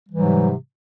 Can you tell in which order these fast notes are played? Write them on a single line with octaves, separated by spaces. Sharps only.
G3 E3 G#2 F#3 C3